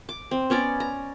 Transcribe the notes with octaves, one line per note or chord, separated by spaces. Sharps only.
D6
C4
B3 C#4 D5 A#5
A#5